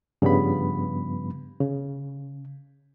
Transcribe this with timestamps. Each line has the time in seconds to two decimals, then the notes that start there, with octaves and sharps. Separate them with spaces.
0.22 G2 C#3 F3 G3 B3 B5
1.60 C#3